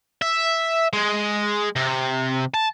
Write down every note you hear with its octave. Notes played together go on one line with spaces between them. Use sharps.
E5
G#3
C3
A5